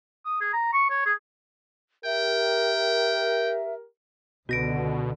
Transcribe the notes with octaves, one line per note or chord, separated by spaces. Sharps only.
D#6
G#4
A#5
C#6
C#5
G#4
G4 A#4 E5 G5
C#2 B2 D3 F#4 A#6 D7